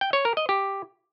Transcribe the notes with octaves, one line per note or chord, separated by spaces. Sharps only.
G5
C#5
A#4
D#5
G4